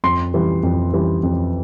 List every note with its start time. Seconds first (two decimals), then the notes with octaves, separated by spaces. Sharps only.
0.04 F2 C6
0.34 E3 G3
0.63 F2
0.94 E3 G3
1.23 F2